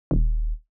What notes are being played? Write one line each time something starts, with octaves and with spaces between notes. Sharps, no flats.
D#1